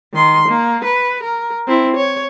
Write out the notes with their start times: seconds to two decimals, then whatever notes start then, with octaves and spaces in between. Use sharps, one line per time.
0.14 D#3 C6
0.49 A#3
0.85 B4
1.23 A#4
1.68 C4 E4
1.97 C#5